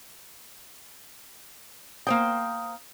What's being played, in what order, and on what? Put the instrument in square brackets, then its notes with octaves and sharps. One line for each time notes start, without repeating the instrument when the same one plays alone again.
[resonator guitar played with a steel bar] A#3 C5 G5 [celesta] D#6